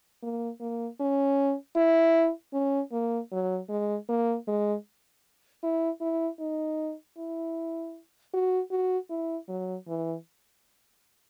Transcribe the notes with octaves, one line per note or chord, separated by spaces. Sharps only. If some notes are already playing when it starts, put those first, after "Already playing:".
A#3
A#3
C#4
E4
C#4
A#3
F#3
G#3
A#3
G#3
E4
E4
D#4
E4
F#4
F#4
E4
F#3
E3